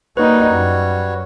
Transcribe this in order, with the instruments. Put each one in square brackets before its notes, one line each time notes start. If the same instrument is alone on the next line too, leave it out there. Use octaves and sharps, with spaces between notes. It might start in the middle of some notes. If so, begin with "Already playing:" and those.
[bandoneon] G3 F#4 C#5 [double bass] A#3 D#4 [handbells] B4
[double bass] F#2